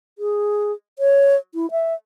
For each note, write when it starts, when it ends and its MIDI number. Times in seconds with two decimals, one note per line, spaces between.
0.18 0.72 68
0.99 1.36 73
1.55 1.70 64
1.71 1.94 76